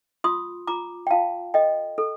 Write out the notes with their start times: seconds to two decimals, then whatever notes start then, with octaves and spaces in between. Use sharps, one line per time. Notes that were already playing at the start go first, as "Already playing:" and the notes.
0.24 F4 C6 D#6
0.67 F4 A#5 D6
1.07 G5
1.11 F4 F5 A5
1.54 A4 D#5 G5
1.98 A4